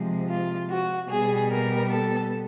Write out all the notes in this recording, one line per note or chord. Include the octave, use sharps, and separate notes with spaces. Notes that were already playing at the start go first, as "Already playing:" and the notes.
Already playing: C3 F3 G#3
F4
F#4
B2 G3 B3 G#4
A#4
A4